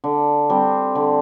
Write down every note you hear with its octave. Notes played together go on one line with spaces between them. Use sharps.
D3
G3 C4
D3